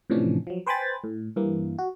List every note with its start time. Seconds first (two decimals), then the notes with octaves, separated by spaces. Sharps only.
0.10 A2 C3 E3 F3 C#4 D4
0.47 F3 F#3
0.66 B4 C5 G5 G#5 B5 A6
1.04 A2
1.36 G2 E3 A#3
1.79 F#4